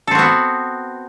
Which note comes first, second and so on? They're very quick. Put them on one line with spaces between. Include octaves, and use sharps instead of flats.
A4 C4 F#4 B3